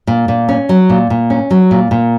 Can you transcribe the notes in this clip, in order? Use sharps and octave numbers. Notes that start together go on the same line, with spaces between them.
A#2
A#2
C#4
F#3
A#2
A#2
C#4
F#3
A#2
A#2